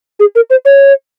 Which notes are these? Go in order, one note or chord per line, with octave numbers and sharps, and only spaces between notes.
G#4
A#4
C5
C#5